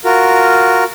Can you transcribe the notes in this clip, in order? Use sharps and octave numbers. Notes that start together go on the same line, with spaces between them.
F4 F#4 A#4